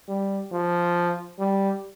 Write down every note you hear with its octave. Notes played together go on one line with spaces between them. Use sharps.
G3
F3
G3